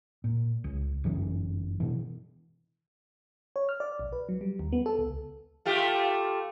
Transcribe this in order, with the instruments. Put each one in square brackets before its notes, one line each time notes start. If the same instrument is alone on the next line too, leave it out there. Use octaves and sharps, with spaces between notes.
[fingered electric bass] A#2
C#2
G1 F#2 E3 C#4
B2 E3
[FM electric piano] C#5
F6
D5
B1
B4
F#3
G3
D#2
B3
A4
C#2
[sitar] A3 F4 G4